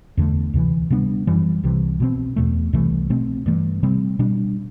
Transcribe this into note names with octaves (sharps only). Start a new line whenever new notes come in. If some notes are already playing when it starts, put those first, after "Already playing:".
E2 D3 A3
D2 C3 E3
C3 G3 B3 D4
F#2 E3 G3
C2 C3 E3
B2 G3 C4
E2 B2 A3
C2 C3 E3 A3
B2 A3 C4
G2 E3 A3
C3 G3 C4
B2 G3 D4